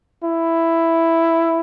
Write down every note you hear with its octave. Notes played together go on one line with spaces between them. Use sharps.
E4